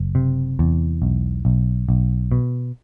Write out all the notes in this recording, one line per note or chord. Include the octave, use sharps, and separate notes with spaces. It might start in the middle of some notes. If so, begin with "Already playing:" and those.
Already playing: F#1
C3
E2
B1
B1
B1
B2